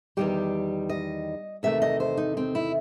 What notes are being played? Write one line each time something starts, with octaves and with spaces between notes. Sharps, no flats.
E2 D#3 G3 G4
D#5
E2 C3 D#3 A3 E5
D#5
C5
D#4
C4
E4